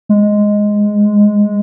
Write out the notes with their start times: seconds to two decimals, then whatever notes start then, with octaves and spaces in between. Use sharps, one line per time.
0.09 G#3